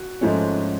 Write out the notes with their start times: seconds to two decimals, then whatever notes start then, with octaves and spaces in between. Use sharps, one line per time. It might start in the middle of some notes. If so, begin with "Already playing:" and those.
Already playing: F#4
0.21 G#2 F3 A3 C#4